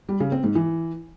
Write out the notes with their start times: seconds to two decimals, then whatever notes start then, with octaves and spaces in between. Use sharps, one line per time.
0.09 G3
0.20 C#3
0.32 C4
0.44 G#2
0.55 E3